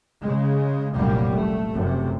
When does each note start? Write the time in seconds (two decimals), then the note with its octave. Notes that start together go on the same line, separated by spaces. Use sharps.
0.22 C#3 G#3
0.94 F1 C2 F#2 A#2 G3 A#3
1.36 A#2 A3
1.73 F1 F#2 C3